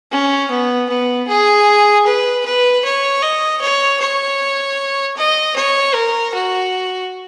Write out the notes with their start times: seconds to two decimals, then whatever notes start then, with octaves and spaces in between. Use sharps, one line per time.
0.12 C#4
0.51 B3
0.89 B3
1.28 G#4
2.06 B4
2.45 B4
2.84 C#5
3.22 D#5
3.61 C#5
4.00 C#5
5.16 D#5
5.56 C#5
5.94 A#4
6.34 F#4